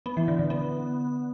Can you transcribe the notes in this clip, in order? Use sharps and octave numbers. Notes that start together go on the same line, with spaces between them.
B3
E3
D3
D3
B3